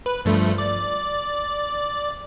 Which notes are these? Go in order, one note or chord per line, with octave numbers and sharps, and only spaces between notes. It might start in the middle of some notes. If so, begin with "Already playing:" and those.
B4
G2 F3 A3
D5